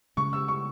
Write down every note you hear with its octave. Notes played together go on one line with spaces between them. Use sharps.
C#3 G#3 C#4 C#6
E6
C#6